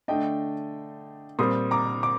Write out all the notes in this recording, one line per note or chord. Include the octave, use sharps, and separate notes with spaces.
D3 A3 D4 D#5 G5
A#2 G3 C4 C6 D#6
A#5 D6
D6